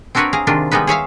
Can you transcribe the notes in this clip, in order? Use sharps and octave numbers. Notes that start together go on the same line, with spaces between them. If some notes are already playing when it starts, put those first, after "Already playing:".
C4 D4 F#4 A#4 B4 C#5
G#4 F5 A#5
C3 D#3 G#3 D4 F4
G3 G#3 B3 D#4 B4
G#4 C#5 E5 F5